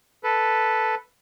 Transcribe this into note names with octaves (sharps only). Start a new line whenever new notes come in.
A4 B4